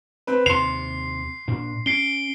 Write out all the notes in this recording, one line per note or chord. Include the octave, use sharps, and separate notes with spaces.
C4 B4
D#2 C3 C6 C7 F7
A#2 D4
C#4 C7 D7 G7